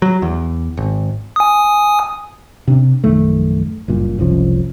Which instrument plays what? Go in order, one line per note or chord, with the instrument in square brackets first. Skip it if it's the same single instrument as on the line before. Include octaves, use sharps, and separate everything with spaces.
[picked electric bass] F#3
E2
G#1
[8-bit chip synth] G#5 D#6
[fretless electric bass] C3 D4
A#1 F#2 D#3 A3
F#1 G2 A#2
F#1 C2 F3 C#4